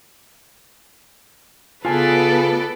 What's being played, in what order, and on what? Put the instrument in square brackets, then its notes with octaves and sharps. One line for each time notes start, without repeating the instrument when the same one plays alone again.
[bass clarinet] C#3 [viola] B3 B4 [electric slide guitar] F4 G#5 A5 [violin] A4 D5